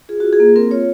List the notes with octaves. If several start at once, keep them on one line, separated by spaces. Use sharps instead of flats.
F4 G#4
F4 F#4
G#4
A#3
C4 A#4
F4 C#5